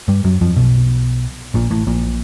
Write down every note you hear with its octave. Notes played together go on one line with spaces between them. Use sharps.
G2 G3
F#2 F#3
F2 F3
B1 B2
A#1 A#2
A1 A2
A#1 A#2